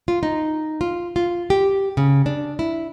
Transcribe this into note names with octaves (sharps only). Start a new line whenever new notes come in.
F4
D#4
F4
F4
G4
C#3
D4
E4